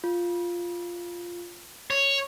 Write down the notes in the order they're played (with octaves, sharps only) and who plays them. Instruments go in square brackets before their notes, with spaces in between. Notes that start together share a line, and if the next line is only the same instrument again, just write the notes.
[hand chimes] F4
[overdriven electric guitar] C#5